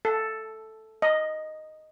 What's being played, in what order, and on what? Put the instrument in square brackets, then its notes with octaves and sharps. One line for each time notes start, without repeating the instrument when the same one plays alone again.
[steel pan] A4
D#5